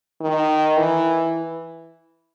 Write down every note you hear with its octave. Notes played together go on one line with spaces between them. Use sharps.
D#3
E3